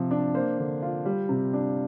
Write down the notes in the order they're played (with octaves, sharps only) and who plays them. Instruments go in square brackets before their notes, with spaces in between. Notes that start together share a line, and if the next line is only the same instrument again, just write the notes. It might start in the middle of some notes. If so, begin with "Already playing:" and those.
Already playing: [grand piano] C3 F3 F4
D4
A#3 C5
D3
F4
G3
C3
D4